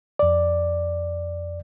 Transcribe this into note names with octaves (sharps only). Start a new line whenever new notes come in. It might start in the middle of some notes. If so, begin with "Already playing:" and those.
F2 D5